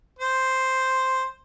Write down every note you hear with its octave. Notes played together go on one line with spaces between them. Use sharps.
C5